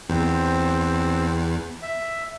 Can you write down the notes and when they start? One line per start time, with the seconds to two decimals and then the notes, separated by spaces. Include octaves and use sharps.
0.09 E2 C4 C5
1.82 E5